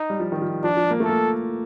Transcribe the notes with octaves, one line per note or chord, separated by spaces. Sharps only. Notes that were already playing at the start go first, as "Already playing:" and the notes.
Already playing: D#4
G3
F3
D#3
F3
F3 D4
F3
A#3
A3 A4
A#3